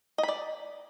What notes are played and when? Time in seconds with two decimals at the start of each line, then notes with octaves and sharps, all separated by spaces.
0.18 D#5
0.23 B5
0.28 D5